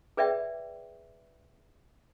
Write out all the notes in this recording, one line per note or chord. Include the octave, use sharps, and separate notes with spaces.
G#4 B4 D5 E5 G5